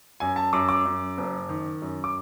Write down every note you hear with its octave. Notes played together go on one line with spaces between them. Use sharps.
F#2 G#5
A5
F#2 D6
D6
F#2
F#1
D#3
F#2
D6